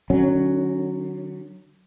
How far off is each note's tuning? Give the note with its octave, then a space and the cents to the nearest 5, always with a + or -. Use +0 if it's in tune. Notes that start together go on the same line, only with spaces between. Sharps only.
D3 +35 F#3 +0 C#4 +0